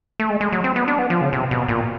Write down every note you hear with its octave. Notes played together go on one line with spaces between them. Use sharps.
A3
G#3
G#3
F#3
C4
B3
D4
B3
F3
C#3
C3
B2
A#2